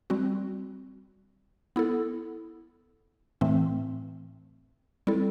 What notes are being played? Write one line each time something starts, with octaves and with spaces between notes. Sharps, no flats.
G3 C4 F#4
B3 E4 A4
A2 E3 A3 C4
G3 C4 E4 A4